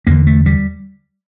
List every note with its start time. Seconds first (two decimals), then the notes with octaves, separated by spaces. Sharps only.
0.07 E2 D3 A#3
0.27 A3
0.46 G3